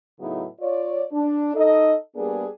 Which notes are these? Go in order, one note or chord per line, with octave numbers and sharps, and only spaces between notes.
A2 C#3 F#3 B3 D#4 E4
F4 C#5 D5
D4
D#4 A4 D#5
G3 A#3 B3 D4 G#4